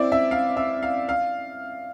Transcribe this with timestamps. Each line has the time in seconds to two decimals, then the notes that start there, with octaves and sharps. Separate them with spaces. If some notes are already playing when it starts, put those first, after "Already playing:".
Already playing: C4 E4 D5
0.12 E5
0.31 F5
0.57 E5
0.83 F5
1.09 F5